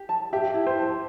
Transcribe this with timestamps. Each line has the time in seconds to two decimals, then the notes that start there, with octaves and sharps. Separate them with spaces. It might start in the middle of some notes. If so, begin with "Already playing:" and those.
Already playing: G4
0.09 A5
0.33 G4 E5
0.54 E4
0.67 C5
0.78 A5